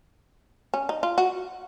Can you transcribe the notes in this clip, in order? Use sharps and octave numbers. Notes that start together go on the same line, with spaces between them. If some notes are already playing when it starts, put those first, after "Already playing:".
C#4
D#4
F4
F#4